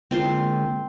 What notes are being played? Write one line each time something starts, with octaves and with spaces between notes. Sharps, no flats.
D3 G#3 A#3 C4 F4 C5